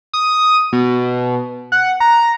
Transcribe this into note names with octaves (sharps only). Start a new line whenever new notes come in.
D#6
B2
F#5
A#5